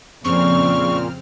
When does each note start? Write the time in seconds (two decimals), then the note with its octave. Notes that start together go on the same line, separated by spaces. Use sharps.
0.25 F2 A#2 C#3 C4 C#6 F6